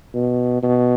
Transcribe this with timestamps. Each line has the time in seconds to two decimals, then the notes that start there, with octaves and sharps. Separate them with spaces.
0.14 B2
0.63 B2